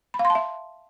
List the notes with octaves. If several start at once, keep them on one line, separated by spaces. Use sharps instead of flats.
B5
F5
C6
A5
E5